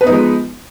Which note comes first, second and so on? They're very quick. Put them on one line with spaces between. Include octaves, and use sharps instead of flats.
B4 B3 D#4 F3 G#3